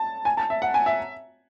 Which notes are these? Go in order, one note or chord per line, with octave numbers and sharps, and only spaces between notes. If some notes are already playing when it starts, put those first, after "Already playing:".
Already playing: A5
G#5
A5
E5
F#5
G#5
E5